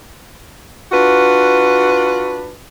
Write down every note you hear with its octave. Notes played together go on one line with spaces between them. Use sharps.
D4 F4 F#4 B4